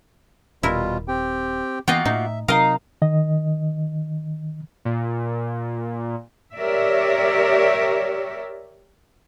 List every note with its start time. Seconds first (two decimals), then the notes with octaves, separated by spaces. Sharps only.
0.63 D#1 B2 G3 E4 F4 A#4
1.08 C4 G4 G5
1.88 E3 A#3 B3 F4 F#4 D#5 G5
2.05 A2 D#4 E5
2.48 C3 F#3 D#4 A#4 D#5 F5 A#5 D#6
3.02 D#3 D#5
4.85 A#2
6.56 G4 A#4 C#5 D5 E5